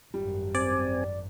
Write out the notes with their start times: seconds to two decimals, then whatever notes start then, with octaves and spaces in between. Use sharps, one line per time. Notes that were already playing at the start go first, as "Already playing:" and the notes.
0.14 G#1 F#2 G3
0.55 C4 D5 G#5